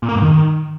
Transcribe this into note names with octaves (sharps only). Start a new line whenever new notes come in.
A#2
A#3
G2
D#3